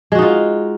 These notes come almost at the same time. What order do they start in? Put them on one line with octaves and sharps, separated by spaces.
G#3 F#4 D#4 F4